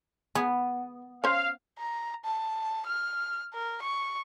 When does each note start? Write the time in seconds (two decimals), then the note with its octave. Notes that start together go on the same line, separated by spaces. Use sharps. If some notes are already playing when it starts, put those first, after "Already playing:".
0.35 B3 G#4
1.24 C#4 C5 F5
1.79 A#5
2.25 A5
2.86 F6
3.54 A#4
3.83 C#6